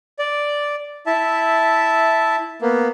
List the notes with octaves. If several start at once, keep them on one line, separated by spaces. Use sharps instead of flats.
D5
E4 E5 A5
A#3 B3